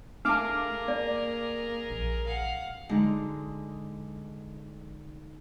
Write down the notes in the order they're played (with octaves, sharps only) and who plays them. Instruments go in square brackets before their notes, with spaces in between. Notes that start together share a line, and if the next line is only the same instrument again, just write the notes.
[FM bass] A3 [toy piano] D4 A5 [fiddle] G#4 A#4 [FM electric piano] F5 D6
[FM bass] A#3 [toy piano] D5
[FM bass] A#1
[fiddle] F5 F#5
[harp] D3 G#3 D#4